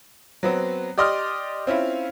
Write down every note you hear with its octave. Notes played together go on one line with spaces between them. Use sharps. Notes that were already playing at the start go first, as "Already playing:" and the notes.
F#3 B3 C4
G4 D5 D#5 C6 D#6 F6
C4 C#4 E4 F4